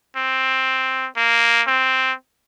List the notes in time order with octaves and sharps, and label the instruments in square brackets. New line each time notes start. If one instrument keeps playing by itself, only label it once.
[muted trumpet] C4
A#3
C4